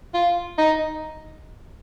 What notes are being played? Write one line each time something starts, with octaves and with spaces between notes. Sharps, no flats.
F4
D#4